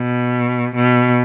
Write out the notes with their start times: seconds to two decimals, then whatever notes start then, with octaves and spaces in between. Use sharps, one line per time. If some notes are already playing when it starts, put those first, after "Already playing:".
Already playing: B2
0.76 B2